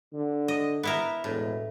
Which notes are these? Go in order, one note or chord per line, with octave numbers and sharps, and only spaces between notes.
D3
D#5
B3 E4 A#4
E1 A2